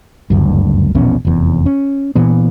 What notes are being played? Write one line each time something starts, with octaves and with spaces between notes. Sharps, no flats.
F#1 D2 G2
A#1 E2 B2 C#4
F1 E2
C#4
A#2 E3 B3